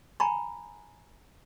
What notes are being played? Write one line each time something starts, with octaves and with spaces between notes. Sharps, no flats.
G5 G#5 A#5 B5 C#6